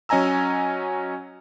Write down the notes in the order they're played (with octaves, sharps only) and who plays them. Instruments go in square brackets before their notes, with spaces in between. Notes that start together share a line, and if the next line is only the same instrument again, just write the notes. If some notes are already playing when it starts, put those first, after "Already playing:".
[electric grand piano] F#3 C#4 D#5 G#5 A#5 E6